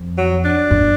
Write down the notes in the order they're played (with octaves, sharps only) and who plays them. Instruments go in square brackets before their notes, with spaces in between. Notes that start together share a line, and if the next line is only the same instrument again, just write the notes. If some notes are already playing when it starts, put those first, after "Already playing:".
Already playing: [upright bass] F2
[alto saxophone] F#3
D4
[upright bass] F#2